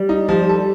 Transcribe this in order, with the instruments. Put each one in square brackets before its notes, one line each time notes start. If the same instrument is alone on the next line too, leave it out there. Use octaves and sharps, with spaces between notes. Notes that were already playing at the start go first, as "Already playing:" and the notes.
Already playing: [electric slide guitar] G3
[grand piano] D#4
F3
A4